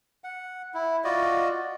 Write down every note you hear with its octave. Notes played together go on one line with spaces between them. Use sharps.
F#5
E4
F4 F#4 D5 D#5